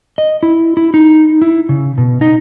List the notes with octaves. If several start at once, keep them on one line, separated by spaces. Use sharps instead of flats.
D#5
E4
E4
D#4
E4
C#3
B2
D#4